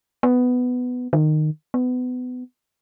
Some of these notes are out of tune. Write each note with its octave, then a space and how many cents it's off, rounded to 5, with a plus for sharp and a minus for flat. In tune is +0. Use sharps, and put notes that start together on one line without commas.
B3 +10
D#3 -20
B3 +25